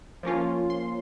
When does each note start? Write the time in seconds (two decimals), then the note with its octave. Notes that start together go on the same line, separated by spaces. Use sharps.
0.23 F3 A#3 C#4 F4
0.70 C6